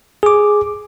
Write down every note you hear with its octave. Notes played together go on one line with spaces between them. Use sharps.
G#4 D6